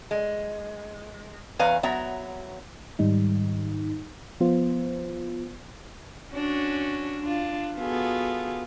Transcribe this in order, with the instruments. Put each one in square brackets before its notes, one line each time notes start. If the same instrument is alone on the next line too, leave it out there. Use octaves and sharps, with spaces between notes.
[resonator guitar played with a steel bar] G#3
E2 B4 C#5 F5 G#5 A#5
F#3 B3 C#5 E5 A#5
[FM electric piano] G#2 D#3 G3 D#4
F3 B3 F4 C5
[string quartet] C#4 D4 F#4
D4 F4
B3 F4 F#4 G#4 A4